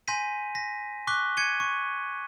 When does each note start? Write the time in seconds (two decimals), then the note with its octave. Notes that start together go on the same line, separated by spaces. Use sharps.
0.07 G#5 C6 G6 A#6 B6 D#7
0.55 A#6 B6
1.07 C#6 D6 F#6 B6 G7
1.37 G#6 C#7 D#7 G7
1.60 C#6